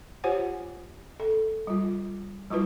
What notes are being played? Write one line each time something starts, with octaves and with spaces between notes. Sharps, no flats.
F4 G4 C5 C#5 F#5 G#5
A4
G3 F4
F#3 G3 E4 F4 B4